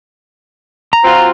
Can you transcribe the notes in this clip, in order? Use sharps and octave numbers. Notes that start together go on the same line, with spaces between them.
A#5
F#3 C4 F4